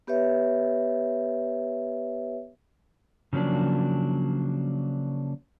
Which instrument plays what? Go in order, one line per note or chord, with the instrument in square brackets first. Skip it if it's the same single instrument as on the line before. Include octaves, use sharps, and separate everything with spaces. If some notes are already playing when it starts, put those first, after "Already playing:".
[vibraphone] B3 G4 B4 C#5 E5
[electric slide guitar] C#3 F3 F#3 A#3 D4